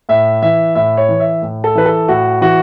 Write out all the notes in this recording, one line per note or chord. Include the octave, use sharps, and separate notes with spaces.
A2 E5
E3 E5
A2 E5
C#5
E3
E5
A2
A4
E3 B4
A4
A2 F#4
E3 F#4